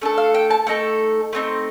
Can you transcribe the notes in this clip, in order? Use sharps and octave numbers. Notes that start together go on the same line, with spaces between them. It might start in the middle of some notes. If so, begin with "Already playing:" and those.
A3 D4 A4
F5
G5
A5
A3 D#4 A4 G5
A3 C4 D#4